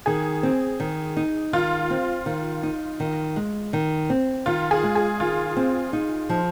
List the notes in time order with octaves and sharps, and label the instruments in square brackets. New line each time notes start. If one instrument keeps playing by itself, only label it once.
[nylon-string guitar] D#3 [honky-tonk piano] G#4
[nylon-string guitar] C4
D#3
D#4
[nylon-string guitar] D#3 [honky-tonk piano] F4
[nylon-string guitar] C4
D#3
D#4
D#3
G#3
D#3
C4
[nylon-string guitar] D#3 [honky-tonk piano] F4
[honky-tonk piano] G#4
[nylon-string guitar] G#3
[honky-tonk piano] G#4
[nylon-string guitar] D#3 [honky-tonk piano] F4
[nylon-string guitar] C4
D#4
F3